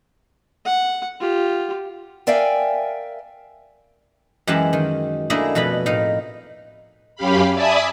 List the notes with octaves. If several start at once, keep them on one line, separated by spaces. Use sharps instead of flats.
F#5
F4 G4
A#4 D5 E5 F5 G5 G#5
F#2 E3 G#3 G4 F#5 A5
D#3
A3 A#3 D4 E4 G#4 D#5
F2 B2 B4 F#5 B5
A2 D#4 A#4 F5
F#2 C#4 G4 F5 B5
D5 E5 G#5 A5 B5 D#6